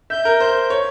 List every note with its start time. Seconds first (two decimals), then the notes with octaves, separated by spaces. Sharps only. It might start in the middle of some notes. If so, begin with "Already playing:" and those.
0.10 E5 G6
0.25 A#4
0.40 C5
0.70 C#5